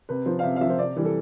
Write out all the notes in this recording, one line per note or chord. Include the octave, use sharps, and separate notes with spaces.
C3 B4
F3 C5
F5
C3 E5
F5
F3 E5
C5
C3 D5
E3 G3
A4